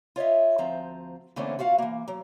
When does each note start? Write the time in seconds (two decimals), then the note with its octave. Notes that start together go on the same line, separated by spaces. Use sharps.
0.16 F4 C#5 D#5 E5
0.58 D2 F3 C4 A#5
1.36 D3 E3 A3 A#3 C4 C#4
1.59 F4 F#4 F5 F#5
1.78 E3 A#3
2.08 F#3